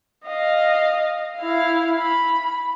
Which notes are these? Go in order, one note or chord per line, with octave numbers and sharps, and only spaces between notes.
D#5 F5
E4 F5
B5